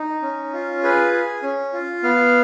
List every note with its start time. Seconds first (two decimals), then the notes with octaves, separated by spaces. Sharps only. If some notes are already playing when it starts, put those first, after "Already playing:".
Already playing: D#4
0.22 C#4
0.53 F4
0.83 G#4 B4
1.13 G#4
1.43 C#4
1.73 F4
2.03 B3 F5